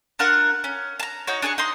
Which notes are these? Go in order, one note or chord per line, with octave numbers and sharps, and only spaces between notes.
D4 F4 A#4 F#5
C#4
A5 A#5
D#4 F#4 C#5
D4 G#4 G#5 C#6
D#4 D#5 C6